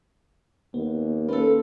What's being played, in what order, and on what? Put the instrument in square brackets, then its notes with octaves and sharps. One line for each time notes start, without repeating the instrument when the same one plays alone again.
[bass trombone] D#2 [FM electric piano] B3
[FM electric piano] A#3 C#4 B4 [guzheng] F4 A4